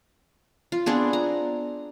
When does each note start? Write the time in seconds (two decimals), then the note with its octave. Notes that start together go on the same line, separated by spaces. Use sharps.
0.72 F4
0.86 B3 C4 D4 G#4
1.13 A#5